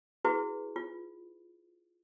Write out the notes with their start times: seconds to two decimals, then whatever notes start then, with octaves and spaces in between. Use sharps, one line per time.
0.25 E4 F#4 G#4 B4
0.76 F4